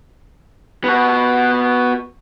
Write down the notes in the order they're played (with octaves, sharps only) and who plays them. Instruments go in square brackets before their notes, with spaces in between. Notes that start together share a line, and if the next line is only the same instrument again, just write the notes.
[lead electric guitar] B3 F#4